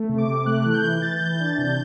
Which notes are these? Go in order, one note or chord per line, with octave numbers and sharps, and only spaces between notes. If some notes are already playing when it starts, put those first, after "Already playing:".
Already playing: A3
C3
D6
C3
A3 F#6
E3
F#6
G6
E3
E3 A6
E3 G6
G6
D4 A6
C3 G6